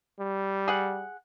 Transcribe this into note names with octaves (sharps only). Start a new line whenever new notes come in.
G3
G#4 F#5